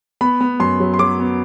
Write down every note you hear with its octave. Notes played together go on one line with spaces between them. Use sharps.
B3 B5
B3
F#2 C6
F#3
C6
F#3 D6
B3